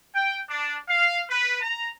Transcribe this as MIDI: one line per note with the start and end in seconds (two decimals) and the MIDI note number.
0.14 0.39 79
0.49 0.76 62
0.88 1.21 77
1.30 1.60 71
1.62 1.90 82